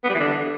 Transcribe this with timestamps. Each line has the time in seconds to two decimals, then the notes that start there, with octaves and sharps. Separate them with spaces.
0.04 B3
0.09 G3
0.14 E3
0.20 D3